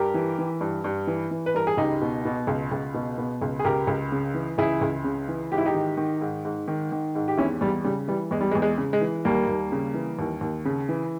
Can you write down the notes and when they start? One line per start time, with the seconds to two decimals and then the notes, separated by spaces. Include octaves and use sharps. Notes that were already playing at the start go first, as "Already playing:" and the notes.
Already playing: G2 G4 A#4
0.14 E3
0.39 E3
0.61 G2
0.84 G2
1.07 E3
1.31 E3
1.46 B4
1.54 G2 A#4
1.67 G#4
1.77 C#2 D#4 G4
2.01 B2
2.25 B2
2.47 C#2
2.71 C#2
2.94 B2
3.18 B2
3.42 C#2
3.59 G#4
3.64 C#2 G4 A#4
3.87 C#2
4.12 C#3
4.34 E3
4.58 C#2 E4 G#4
4.81 C#2
5.04 C#3
5.28 E3
5.52 G#2 G4
5.58 E4
5.66 D#4 G4
5.74 D#3
5.97 D#3
6.21 G#2
6.45 G#2
6.68 D#3
6.92 D#3
7.15 G#2
7.28 G4
7.37 E2 C#4 E4
7.61 E2 G3
7.84 C#3 G3
8.08 E3 G3
8.31 E2 G#3
8.41 G3
8.51 G#3
8.55 E2
8.62 G#3
8.78 C#3
8.93 G#3
9.01 E3
9.25 D#2 G3 A#3
9.48 D#2
9.72 C#3
9.94 E3
10.19 D#2
10.41 D#2
10.65 C#3
10.89 E3